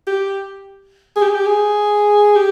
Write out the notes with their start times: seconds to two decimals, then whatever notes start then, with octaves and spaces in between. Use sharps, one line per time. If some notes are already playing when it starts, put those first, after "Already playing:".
0.07 G4
1.16 G#4
1.22 G4
1.29 G#4
1.35 G4
1.46 G#4
2.36 G4